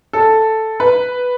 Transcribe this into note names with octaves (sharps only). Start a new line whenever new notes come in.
A4
B4